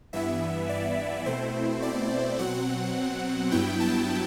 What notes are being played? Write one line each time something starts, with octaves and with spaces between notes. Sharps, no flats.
G2 E3 B3 E4 E5
D5
B2 A3 C4 E4 C5
D5
B2 F#3 C4 F#5
G2 F#3 B3 E4 G5
A5